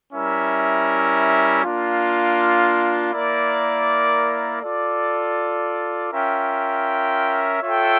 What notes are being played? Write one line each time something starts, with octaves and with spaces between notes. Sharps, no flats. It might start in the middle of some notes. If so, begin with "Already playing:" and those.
G3 C#4 E4 A#4 E5
A#3 D4 F4
A#3 E4 A#4 D5
F4 A4 D5
C#4 F4 A#4 E5 G5
F4 A4 C#5 E5 G5